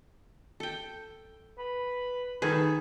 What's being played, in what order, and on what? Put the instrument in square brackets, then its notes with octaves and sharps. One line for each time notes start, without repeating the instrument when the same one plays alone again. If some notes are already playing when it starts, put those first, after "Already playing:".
[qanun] A4 G5
[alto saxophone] B4
[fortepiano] D#3 B4 [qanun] G#4 [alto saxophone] A4